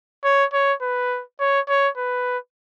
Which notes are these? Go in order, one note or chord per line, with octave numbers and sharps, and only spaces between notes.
C#5
C#5
B4
C#5
C#5
B4